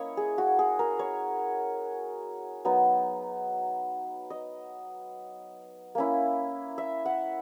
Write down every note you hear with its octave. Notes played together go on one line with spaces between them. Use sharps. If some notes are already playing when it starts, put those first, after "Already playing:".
Already playing: A#3 C#4 E4 C#5 D#5
G#4
F#4
G#4
A#4
C#5
F#3 B3 D#4
D#5
A#3 C#4 E4
E5
F#5